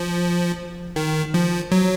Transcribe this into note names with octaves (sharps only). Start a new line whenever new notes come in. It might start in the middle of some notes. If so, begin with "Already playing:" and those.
Already playing: F3
D#3
F3
F#3